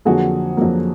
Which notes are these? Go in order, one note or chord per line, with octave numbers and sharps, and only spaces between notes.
F2 D3 F#3 A#3 F#4 G#4
F2 D3 F#3 A#3